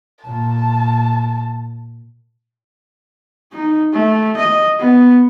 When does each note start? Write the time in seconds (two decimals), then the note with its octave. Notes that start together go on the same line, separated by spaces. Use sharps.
0.25 A#2 A5
3.52 D#4
3.93 A3
4.37 D#5
4.79 B3